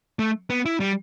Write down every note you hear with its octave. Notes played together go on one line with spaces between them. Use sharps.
A3
B3
E4
G3